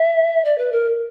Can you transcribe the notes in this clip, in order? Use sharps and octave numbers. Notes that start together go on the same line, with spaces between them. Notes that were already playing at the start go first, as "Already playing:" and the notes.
Already playing: E5
D5
B4
A#4